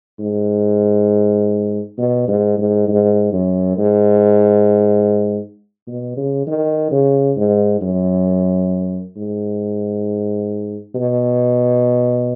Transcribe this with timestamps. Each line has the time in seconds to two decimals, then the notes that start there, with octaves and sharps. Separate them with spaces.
0.19 G#2
1.98 B2
2.28 G#2
2.58 G#2
2.88 G#2
3.33 F#2
3.78 G#2
5.87 B2
6.17 C#3
6.47 D#3
6.91 C#3
7.36 G#2
7.81 F#2
9.16 G#2
10.95 B2